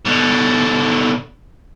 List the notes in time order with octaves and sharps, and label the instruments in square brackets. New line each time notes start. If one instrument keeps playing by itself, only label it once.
[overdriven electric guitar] B2 D3